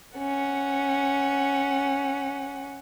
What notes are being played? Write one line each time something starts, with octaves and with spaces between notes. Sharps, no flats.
C#4 F#5